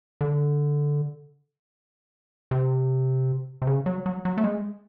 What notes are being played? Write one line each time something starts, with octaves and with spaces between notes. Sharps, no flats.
D3
C3
C3
C#3
F#3
F#3
F#3
A3
G#3